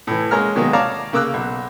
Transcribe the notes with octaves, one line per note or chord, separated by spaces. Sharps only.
A2 E3
G#3 A#3 C#4 A#5 F6
B2 D#3 F#3 G#3 A#3 B3
C#5 D5 F5 A5 A#5 D6
C#3 A#3 D6 E6 F#6
B1